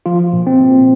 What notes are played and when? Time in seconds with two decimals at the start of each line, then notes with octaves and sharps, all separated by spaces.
0.06 F3 F4
0.33 A#2
0.47 C4
0.60 A#2